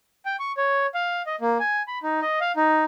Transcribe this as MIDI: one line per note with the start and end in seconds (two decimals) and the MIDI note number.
0.26 0.36 79
0.39 0.52 85
0.57 0.87 73
0.94 1.22 77
1.26 1.36 75
1.41 1.58 58
1.60 1.82 80
1.88 1.98 83
2.03 2.20 63
2.22 2.39 75
2.41 2.52 77
2.56 2.84 63